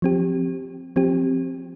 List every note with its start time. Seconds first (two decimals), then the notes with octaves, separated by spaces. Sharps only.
0.02 F3 C4 G4
0.96 F3 C4 G4